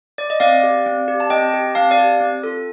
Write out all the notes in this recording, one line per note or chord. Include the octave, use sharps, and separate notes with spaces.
D5
D#5
C4 D5 F5
G4
C4
G4
A5
C4 D#5 G5
G4
C4 F5 A5
D5 F5
G4
C4
F4 A4